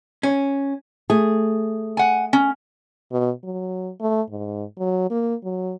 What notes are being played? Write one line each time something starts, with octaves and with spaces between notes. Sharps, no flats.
C#4
A3 G#4
F#5 G#5
C#4
B2
F#3
A3
G#2
F#3
A#3
F#3